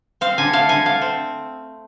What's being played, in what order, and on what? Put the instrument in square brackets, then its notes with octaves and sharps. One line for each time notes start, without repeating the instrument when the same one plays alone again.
[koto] C4 F5
D3 G#5
A3 F5
D3 G#5
A3 F5
C4